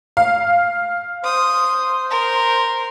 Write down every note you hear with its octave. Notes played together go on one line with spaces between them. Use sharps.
F5
C5 D#6
A#4